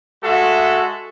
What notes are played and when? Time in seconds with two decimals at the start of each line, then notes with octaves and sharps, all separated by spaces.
0.23 G#3 F#4 A4 E5